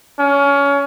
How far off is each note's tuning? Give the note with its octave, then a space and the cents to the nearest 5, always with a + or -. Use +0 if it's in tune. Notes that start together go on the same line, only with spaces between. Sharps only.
C#4 +25